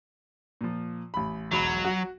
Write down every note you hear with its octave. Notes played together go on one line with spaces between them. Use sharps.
A#2 F3
A1 B5
E1 B1 F#3 B5
F#4